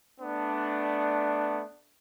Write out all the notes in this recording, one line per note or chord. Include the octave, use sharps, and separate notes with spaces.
A3 B3 D4